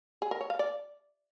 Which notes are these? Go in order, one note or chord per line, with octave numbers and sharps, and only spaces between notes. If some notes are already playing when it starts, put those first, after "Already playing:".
G#4
A#4
C#5
F5
D5